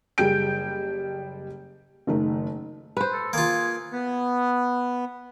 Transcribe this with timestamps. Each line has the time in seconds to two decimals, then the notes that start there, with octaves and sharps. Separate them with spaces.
0.18 F#1 G3 G#4 G5 G6 D7
2.07 F#1 D#3 A3
2.97 B4 C5
3.13 A4
3.33 A#3 F4 G#4
3.93 B3